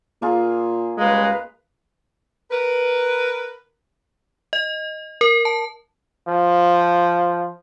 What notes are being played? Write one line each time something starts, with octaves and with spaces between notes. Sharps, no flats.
A#2 A#3 F4 G#4
C#2 G3 G#3 B4 F5 A#5
A#4 B4
D#5
A#4
A5
F3